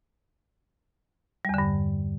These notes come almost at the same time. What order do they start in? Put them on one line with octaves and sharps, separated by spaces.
G3 E2 D3 G2